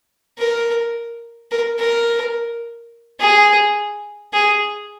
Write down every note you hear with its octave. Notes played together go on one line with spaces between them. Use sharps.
A#4
A#4
A#4
G#4
G#4